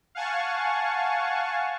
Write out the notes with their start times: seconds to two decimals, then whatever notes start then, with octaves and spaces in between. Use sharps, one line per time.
0.15 F5 F#5 G#5 A5 C#6